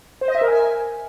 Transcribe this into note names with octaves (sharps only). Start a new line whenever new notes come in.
C5
D#5
E5
A#4
G#5